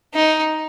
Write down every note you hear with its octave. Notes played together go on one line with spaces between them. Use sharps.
D#4